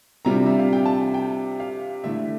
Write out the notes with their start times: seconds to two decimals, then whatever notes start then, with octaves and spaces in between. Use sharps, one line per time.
0.25 C3 G3 D4 F4 A#5
0.46 E5
0.59 F5
0.73 G5
0.86 A5
1.14 G5
1.60 F5
2.04 D3 A3 E4 E5